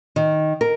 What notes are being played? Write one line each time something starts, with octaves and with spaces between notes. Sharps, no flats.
D#3
A#4